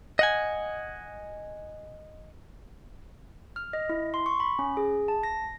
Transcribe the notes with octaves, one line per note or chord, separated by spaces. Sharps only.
D#5 F#5 G#5
F6
D#5
E4
C6
C#6
B5
C#4
G#4
A5
A#6